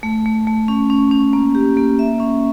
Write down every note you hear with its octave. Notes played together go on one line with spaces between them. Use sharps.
A3
A3
A3
C#4
C#4
C#4
A#3
G4
A#3
E5
C#4